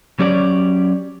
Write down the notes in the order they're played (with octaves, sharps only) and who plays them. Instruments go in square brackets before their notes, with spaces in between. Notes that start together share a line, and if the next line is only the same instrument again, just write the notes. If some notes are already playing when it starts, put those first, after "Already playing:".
[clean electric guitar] F#3 C#4 G4 C#5 D5